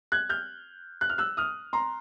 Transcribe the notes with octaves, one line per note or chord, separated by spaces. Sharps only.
F#6 G#6
F6 G6
F#6
F6
E6 F#6
D#6 F6
A#5 C6